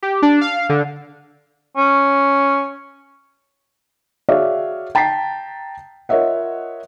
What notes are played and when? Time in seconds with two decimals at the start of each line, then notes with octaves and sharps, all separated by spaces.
0.03 G4
0.22 D4
0.41 F5
0.69 D3
1.77 C#4
4.29 F#4 G#4 C#5 D5 E5 F5
4.95 G5 A5 A#5 B6 C7
6.09 F4 A#4 C#5 D#5 E5 F#5